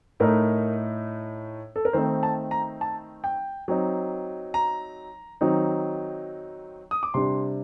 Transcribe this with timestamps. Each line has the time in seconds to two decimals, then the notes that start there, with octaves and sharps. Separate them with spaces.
0.20 A2 A3 D#4 A#4
1.76 A4
1.85 A#4
1.93 D#3 A3 C4 D#4 C5
2.23 A5
2.51 A#5
2.81 A5
3.24 G5
3.68 F#3 C4 D#4
4.54 A#5
5.41 D#3 F#3 C4 D#4
6.91 D#6
7.03 D6
7.14 C3 G3 D4 C6